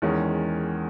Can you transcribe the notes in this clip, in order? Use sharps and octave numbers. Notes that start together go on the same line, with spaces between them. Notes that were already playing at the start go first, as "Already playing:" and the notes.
E2 D#3 G#3 C#4